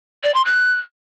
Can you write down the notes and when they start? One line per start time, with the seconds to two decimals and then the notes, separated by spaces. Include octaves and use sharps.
0.23 D5
0.34 C6
0.45 F#6